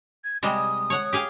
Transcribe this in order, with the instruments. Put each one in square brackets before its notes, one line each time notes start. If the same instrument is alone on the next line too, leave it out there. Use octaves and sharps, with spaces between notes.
[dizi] G#6
[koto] C3 G3 G#3 [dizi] D#6
[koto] C#5 F#5
G4 G#4 F5